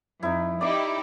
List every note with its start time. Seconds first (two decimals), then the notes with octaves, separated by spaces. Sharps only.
0.23 F2 D#4 E4
0.61 D#4 E4 G4 D5 D6